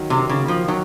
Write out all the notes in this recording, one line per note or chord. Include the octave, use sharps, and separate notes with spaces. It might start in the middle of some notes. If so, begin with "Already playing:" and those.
Already playing: D#3 F#3
C3
D#3
C#3
A#3
F3
D#3 F#3